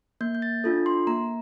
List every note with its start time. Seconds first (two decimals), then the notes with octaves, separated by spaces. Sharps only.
0.21 A#3 G6
0.35 G6
0.42 A6
0.64 D4 F4 A4
0.86 C6
1.07 A#3 A#5